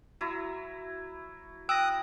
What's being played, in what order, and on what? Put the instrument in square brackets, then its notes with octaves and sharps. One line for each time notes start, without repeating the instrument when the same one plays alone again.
[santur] F#3 E4
[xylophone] G5 A#6 [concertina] D#6 F#6 [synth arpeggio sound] E6